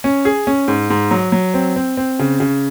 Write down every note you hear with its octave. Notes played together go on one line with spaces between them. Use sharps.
C#4
G#4
C#4
G#2
G#2
F#3
F#3
C4
C4
C4
C#3
C#3